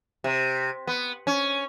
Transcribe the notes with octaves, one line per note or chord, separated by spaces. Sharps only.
C3
B3
C#4